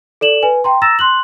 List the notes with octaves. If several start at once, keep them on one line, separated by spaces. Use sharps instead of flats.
A4 D5 E7 F#7
B4 G#5
G5 A#5 C6
A#5 E6 A6 A#6 E7
C6 F#6 F#7